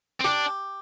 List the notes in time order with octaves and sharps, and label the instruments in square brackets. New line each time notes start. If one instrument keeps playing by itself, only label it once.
[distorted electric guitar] C4
[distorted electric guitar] D4 [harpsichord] G4